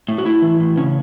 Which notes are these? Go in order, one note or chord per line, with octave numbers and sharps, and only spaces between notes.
A2
F#4
A2 E4
E3
A2
C#3 C#4